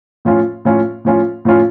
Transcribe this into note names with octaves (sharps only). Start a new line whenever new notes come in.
A2 F3 C#4 F4
A2 F3 C#4 F4
A2 F3 C#4 F4
A2 F3 C#4 F4